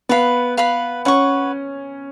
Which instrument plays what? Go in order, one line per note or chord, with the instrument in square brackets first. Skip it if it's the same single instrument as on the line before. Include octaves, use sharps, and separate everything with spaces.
[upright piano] B3 [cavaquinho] B4 F5 B5
[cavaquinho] B4 F5 B5
[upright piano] C#4 [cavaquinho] B4 F#5 C#6